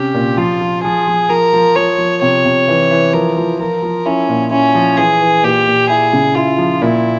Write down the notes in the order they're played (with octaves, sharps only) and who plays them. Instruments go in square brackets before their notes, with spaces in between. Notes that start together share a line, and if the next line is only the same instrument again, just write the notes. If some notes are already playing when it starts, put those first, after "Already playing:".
Already playing: [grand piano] C3 C#4 [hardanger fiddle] G4
[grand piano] A#2
[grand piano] F3 [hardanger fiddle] F4
[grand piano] F3
[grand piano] F3 [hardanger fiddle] G#4
[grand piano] F3
[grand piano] F3 [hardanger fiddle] A#4
[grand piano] F3
[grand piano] F3 [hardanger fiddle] C#5
[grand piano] F3
[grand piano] C3 [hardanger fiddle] C#5
[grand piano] C3
E3
E3
[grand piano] F3 [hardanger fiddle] A#4
[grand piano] F3
[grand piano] F3 [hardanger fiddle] A#4
[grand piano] F3
[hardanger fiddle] C#4 [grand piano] E4
[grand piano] A#2
[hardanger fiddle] C#4 [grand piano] E4
[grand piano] F3
[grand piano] E3 [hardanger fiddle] G#4
[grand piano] E3
[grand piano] A#2 [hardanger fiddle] G4
[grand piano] A#2
[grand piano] E4 [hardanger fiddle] G#4
[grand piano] C#3
[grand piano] E4 [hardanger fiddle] F4
[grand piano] F3
[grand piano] A#2 [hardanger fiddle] E4